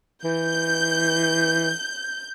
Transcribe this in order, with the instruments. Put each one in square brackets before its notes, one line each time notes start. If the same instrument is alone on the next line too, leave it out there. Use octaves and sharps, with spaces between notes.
[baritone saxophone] E3 [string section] G6